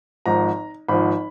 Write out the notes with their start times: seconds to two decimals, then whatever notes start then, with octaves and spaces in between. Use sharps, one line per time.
0.26 G#1 G#2 F3 A#5
0.88 G#1 G#2 F3 B5